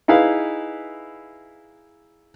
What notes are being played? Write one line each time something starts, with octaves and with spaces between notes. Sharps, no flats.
D#4 E4 G#4 B4 F5